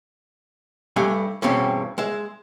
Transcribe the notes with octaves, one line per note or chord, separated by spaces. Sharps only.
G2 G3 A3 D4 G#5
E2 G2 B2 G3 C4 C#4
G#3 E5